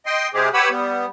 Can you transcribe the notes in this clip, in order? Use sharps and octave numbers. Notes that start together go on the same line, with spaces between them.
D#5 G5 C6
C3 G#3 C4 G4 G#4
G4 B4 C#5 F#5 B5 E6
G3 B3